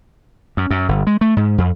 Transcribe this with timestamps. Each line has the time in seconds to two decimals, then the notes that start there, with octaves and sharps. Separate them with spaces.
0.57 F#2
0.71 F#2
0.88 G1
1.07 G#3
1.21 A3
1.37 G#2
1.58 F2